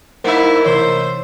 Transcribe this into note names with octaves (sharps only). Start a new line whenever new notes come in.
A3 A#3 D#4 E4 C5 E5 F#5
C3 E3 C5 C#5